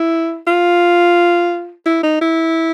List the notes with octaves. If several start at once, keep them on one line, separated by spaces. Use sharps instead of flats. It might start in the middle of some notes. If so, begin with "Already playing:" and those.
Already playing: E4
F4
E4
D#4
E4